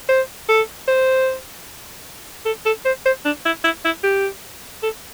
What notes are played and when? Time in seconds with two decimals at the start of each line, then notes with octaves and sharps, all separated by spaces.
0.09 C5
0.49 A4
0.88 C5
2.45 A4
2.65 A4
2.85 C5
3.06 C5
3.25 D4
3.45 E4
3.64 E4
3.85 E4
4.03 G4
4.83 A4